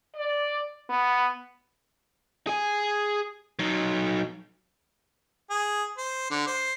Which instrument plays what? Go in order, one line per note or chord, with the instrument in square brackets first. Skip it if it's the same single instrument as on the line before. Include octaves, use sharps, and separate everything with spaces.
[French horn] D5
B3
[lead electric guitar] G#4 G#5
F#3 D#4
[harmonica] G#4
C5
D3
C5